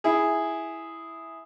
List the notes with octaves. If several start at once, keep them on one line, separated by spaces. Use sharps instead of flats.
E4 G#4